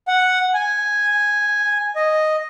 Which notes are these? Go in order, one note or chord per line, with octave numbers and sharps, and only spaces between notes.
F#5
G#5
D#5